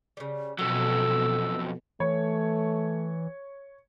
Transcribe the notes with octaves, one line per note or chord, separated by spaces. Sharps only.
C#3 G3
F2 B2 F#3 A4 E6
E3 A3 C#5